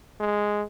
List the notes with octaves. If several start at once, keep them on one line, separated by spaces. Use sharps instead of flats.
G#3